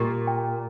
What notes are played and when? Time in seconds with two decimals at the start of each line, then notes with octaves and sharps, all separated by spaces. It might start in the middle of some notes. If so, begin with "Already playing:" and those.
Already playing: A#2 G4
0.27 G5